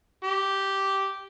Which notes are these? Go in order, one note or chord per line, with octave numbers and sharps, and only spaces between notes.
G4